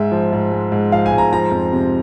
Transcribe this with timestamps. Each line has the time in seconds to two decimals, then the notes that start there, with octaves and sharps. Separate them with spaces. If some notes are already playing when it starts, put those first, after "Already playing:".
Already playing: G#2 G#3 E5
0.12 F3
0.32 G#2
0.52 G#3
0.72 G#2
0.92 F3 F5
1.06 G#5
1.12 G#2
1.18 A#5
1.33 F3 A#5
1.51 F2
1.73 C3